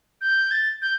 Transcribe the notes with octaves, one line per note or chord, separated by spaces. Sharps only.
G6
A6
G6